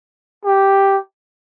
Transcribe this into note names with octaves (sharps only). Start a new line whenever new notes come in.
G4